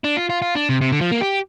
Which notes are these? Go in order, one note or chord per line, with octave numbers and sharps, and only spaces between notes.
D4
F4
F4
F4
D4
C3
C3
D3
F3
A#3
G4